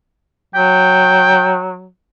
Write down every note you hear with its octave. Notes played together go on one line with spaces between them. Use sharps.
F#3 G5